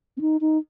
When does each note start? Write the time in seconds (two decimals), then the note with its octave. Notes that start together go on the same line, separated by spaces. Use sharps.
0.17 C4
0.21 D#4
0.41 D#4